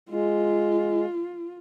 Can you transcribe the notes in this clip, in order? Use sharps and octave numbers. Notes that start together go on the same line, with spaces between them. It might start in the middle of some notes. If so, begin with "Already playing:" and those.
G#3 F4